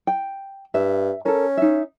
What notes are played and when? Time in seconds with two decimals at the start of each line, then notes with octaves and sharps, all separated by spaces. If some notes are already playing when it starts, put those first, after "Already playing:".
0.07 G5
0.74 G2 E5
1.25 C#4 A4 A#4
1.57 D#4 E5